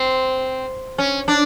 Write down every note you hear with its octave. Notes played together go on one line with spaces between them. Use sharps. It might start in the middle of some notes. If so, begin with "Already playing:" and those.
Already playing: C4
C#4
D4